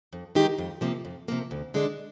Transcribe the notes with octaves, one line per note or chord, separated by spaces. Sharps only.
F2
D#3 G#3 D#4 G4
F2
C3 F3 A#3
F2
C3 F3 A#3
D2
D3 G#3 D4